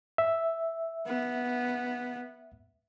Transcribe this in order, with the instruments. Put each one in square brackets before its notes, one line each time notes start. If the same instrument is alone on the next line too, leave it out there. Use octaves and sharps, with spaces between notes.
[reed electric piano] E5
[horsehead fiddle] B3